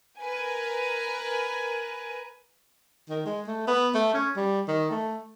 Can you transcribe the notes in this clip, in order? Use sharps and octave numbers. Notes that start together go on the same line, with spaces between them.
A#4 B4 G#5
D#3
G#3
A3
B3
A3
C#4
G3
D#3
A3